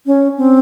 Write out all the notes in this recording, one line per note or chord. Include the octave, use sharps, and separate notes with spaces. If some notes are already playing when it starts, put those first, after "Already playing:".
C#4
C4